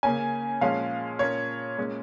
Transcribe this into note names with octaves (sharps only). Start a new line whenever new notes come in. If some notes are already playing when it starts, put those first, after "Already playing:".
C#3 A#3 C#4 G#5
A#2 F3 G#3 C#4 F5
A#2 A#3 C#4 C#5
A#2 G#3 C#4